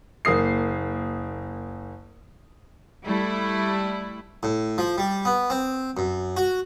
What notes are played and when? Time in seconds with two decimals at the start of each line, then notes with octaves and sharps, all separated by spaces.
0.25 F#1 A#3 D#6 C7
3.04 G3 A3 E4
4.43 A2
4.78 F3
4.98 G3
5.25 B3
5.50 C4
5.97 F#2
6.37 F#4